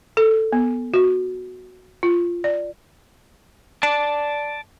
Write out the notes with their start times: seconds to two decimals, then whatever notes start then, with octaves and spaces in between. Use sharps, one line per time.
0.17 A4
0.53 B3
0.94 F#4
2.03 F4
2.44 D5
3.83 D5 A5